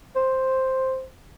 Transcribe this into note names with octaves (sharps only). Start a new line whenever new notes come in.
C5